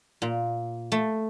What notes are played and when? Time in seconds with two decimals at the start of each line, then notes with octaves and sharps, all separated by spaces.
0.22 A#2
0.92 A3